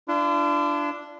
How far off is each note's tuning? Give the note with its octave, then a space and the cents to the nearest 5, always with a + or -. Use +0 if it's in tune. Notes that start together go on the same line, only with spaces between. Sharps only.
D4 +0 F4 -45